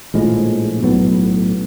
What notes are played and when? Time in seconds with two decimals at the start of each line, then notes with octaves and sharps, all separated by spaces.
0.14 A#1 A2 F3 G#3
0.83 B1 A2 F#3 B3